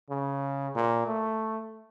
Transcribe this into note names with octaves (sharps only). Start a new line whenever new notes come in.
C#3
A#2
A3